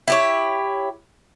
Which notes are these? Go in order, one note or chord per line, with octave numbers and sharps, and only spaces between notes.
E4 G4 C#5